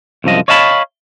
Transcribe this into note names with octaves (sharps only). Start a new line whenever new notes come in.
C2 F#2 F3 D#5
C#5 D#5 F5 A5 B5